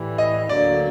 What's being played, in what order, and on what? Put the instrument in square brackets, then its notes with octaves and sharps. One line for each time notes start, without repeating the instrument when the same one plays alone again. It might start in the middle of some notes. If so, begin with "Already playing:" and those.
Already playing: [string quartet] A2 E3 G3
[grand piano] D#5
[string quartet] D2 D3 F#3 A#3 [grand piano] D5